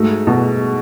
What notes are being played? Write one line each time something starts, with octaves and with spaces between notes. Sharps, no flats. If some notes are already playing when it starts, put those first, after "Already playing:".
Already playing: G#2 A3 F#4
B2